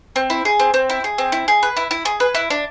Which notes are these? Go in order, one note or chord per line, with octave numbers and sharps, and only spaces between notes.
C4
E4
G#4
C4
C4
E4
G#4
C4
E4
G#4
B4
E4
E4
G#4
B4
E4
D4